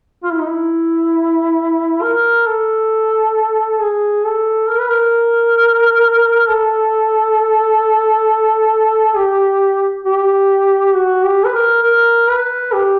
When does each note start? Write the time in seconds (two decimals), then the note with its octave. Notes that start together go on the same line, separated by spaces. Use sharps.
0.23 F4
0.31 E4
0.39 D#4
0.46 E4
2.02 A#4
2.46 A4
3.80 G#4
4.25 A4
4.69 A#4
4.78 B4
4.88 A#4
6.48 A4
9.16 G4
10.05 G4
10.94 F#4
11.24 G4
11.44 B4
11.54 A#4
11.83 A#4
12.28 B4
12.72 G4